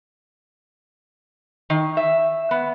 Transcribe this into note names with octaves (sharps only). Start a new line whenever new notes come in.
D#3
E5
B3